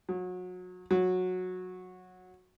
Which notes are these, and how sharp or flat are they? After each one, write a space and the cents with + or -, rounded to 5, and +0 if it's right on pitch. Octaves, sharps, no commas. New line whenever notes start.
F#3 -30
F#3 -15